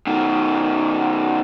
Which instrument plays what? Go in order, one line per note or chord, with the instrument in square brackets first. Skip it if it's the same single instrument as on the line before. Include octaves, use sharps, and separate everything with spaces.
[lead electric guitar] B2 D#3